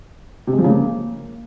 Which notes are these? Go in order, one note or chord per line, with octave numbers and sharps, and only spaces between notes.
C3
G#3
F3
C#3
A#3